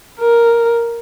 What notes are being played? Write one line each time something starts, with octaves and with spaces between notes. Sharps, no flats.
A#4